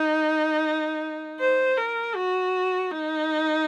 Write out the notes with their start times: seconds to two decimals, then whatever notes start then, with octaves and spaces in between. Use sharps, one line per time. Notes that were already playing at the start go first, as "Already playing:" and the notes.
Already playing: D#4
1.40 C5
1.77 A#4
2.15 F#4
2.91 D#4